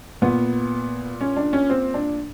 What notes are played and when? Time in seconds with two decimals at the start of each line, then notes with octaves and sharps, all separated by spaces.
0.22 A#2 B3
1.21 C#4
1.37 D4
1.53 C#4
1.69 C4
1.94 D4